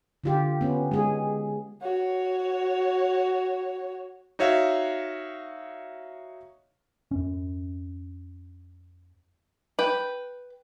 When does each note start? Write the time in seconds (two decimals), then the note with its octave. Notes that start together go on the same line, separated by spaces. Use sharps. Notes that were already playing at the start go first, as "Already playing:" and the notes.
0.24 D3 F4 G4
0.61 B3 C#4
0.91 G#3 G#4
1.83 F#4 C#5
4.39 D#4 F#4 C#5 E5 F5
7.11 F2 C#4
9.79 B4 G5